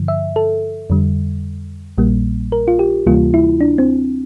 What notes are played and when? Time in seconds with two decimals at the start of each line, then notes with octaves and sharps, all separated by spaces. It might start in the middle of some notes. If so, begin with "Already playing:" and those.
Already playing: G2 D3 F3
0.08 E5
0.36 A4
0.90 F2 D3 G3
1.98 A#1 A#2 G3 A#3
2.52 A#4
2.68 F4
2.79 G4
3.07 D2 C3 E3 G3 A#3 F4
3.34 E4
3.61 D4
3.78 C4